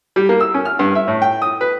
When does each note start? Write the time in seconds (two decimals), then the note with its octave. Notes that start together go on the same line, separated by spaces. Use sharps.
0.16 G3
0.29 A#3
0.41 E6
0.54 C#4
0.65 F6
0.79 G2
0.95 E5
1.08 A2
1.22 G5
1.42 D#6
1.61 B4